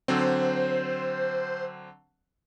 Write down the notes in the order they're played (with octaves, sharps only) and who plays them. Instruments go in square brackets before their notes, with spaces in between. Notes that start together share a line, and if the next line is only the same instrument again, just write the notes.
[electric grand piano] D3 F#3 C4 [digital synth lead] C5